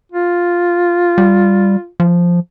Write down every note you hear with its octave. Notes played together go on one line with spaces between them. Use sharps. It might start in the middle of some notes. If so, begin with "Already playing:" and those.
F4
G3
F3